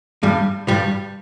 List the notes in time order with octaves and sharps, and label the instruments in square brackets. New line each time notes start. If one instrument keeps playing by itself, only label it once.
[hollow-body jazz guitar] G2 G3
G2 G3